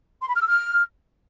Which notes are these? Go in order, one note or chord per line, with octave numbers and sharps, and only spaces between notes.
C6
B5
F6
E6
F6